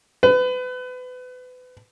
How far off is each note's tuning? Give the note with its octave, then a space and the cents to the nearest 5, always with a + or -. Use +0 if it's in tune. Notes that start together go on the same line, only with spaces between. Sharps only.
B4 +30